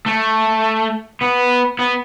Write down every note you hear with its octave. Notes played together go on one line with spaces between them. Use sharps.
A3
B3
B3